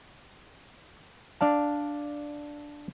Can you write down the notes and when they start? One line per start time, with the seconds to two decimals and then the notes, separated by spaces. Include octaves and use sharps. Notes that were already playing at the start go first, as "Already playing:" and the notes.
1.41 D4 D5 F5 A5